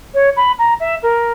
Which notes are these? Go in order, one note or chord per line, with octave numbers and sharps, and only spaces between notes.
C#5
B5
A#5
E5
A#4